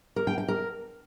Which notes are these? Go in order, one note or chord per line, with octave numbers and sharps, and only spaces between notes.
A#4
G5
G5
A#4